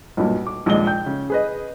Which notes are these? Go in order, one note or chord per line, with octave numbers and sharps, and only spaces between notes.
B1 G2 A#2
D6
A#1 D#2 G#3 D#5 G7
G5 G6
C#3
G#4 B4 D#5